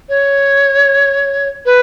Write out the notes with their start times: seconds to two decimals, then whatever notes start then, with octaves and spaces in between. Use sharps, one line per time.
0.09 C#5
1.66 B4